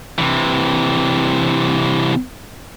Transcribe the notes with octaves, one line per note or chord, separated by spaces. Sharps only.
C3 E3